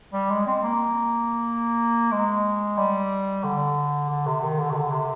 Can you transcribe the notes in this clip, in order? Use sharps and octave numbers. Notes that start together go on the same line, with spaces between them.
G3
G#3
C4
A#3
G#3
G3
D3
D3
C3
D#3
D3
C3
D3
C3